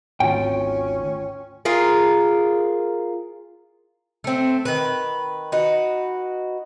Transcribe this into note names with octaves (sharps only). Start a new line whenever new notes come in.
G#1 D2 C#4 F4 G5
F4 G#4 A#4
A3 C4
D#3 B4
D#4 F#4 B4